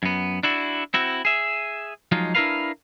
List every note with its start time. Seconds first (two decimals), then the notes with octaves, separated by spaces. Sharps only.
0.03 F#2 B3
0.43 D4 E4 F#4
0.94 C4 E4 F#4
1.25 G#4 E5
2.12 F3 F#3 G#3 D#4 F4
2.35 D4 E4 G4 A#4 B4 F5